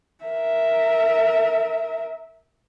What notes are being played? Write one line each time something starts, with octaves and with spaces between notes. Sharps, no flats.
A#4 E5